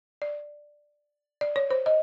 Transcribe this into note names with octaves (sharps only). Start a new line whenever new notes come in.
D5
D5
C#5
C5
D#5